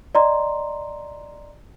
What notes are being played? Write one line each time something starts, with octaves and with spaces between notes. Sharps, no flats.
D5 D#5 A#5 C6